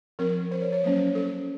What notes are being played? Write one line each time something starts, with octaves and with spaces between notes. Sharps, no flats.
F3 C4 A#4
C5
C#5
C#5
F#3 A#3 C#4 C5
A4